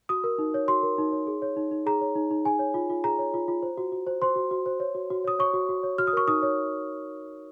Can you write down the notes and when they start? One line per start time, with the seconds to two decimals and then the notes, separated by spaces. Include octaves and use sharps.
0.09 F#4 D#6
0.24 A#4
0.39 D#4
0.54 C#5
0.68 F#4 C6
0.83 A#4
0.98 D#4
1.12 C#5
1.27 G#4
1.42 C#5
1.57 D#4
1.71 D#4
1.86 G#4 A#5
2.01 C#5
2.16 D#4
2.31 D#4
2.45 G#4 G#5
2.59 C#5
2.74 F4
2.90 F4
3.04 G#4 A#5
3.19 C#5
3.34 F4
3.48 F4
3.63 C5
3.78 F#4
3.92 F#4
4.07 C5
4.22 C5 C6
4.36 F#4
4.51 F#4
4.66 C5
4.80 C#5
4.95 F#4
5.10 F#4
5.24 C#5 D#6
5.39 C#5 C#6
5.53 F#4
5.69 F#4
5.83 C#5
5.98 F#4 F6
6.07 D#6
6.13 A#4 C#6
6.28 D#4 D#6
6.43 C#5